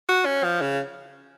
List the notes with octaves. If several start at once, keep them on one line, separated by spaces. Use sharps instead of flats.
F#4
C#4
F3
C#3